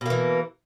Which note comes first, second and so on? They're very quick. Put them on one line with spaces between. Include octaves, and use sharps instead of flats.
B2 A#3 E3